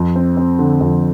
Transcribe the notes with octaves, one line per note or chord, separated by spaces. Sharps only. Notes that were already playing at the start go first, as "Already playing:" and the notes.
Already playing: F2
C4
C4
D3
F2